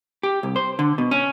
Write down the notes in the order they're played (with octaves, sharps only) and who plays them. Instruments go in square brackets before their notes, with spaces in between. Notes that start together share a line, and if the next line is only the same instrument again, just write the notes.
[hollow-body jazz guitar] G4
C2
C5
D3
B2
C#4